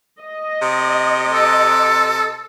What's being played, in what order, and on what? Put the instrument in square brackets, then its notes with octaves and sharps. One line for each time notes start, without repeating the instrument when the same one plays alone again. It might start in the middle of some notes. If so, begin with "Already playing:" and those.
[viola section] D#5
[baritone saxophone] C3
[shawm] A4